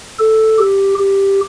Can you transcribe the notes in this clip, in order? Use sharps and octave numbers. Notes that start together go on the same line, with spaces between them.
A4
G4
G4